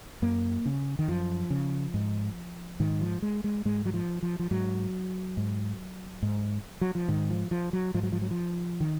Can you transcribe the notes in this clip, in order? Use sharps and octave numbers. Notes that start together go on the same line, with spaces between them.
F#2 A#3
C#3
D#3
F#2 F3
C#3
G#2
G#2 D#3
F3
G#3
G#3
G#2 G#3
F#3
F3
F3
F3
G#2 F#3
G#2
G#2
F#3
F3
G#2 D#3
F3
F3
F#3
G#2 F3
F#3
F3
F#3
F3
D#3